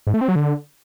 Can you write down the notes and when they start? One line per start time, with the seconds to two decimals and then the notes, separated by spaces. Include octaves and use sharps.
0.07 G#2
0.14 A3
0.21 C4
0.28 F#3
0.36 D3